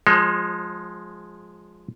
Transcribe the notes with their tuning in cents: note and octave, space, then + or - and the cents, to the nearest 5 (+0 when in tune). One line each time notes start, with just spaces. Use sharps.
F3 +15 G#3 +0 C5 +45